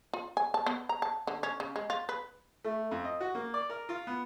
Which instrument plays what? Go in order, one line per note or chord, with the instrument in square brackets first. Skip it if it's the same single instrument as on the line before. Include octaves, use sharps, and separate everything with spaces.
[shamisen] F4
G#5
A5
B3
A#5
A5
D3
C#4
C#3
G#3
F4
B4
[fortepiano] A3
F2
D#5
F#4
A#3
D5
A#4
F4
B3